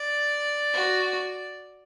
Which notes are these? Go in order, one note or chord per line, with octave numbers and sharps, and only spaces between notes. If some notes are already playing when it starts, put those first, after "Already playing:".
Already playing: D5
F#4